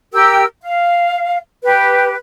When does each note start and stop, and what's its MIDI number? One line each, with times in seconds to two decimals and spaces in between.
0.12 0.44 67
0.12 0.44 70
0.12 0.44 79
0.12 0.44 88
0.61 1.38 77
1.63 2.15 67
1.63 2.15 71